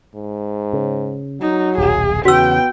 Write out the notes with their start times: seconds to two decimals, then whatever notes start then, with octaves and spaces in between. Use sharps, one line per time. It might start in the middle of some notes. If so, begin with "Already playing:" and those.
0.15 G#2
0.73 C#3
1.41 F#3 D#4
1.78 D#1 B1 G#4
2.25 E2 C#3 B3 F#4 G5 E6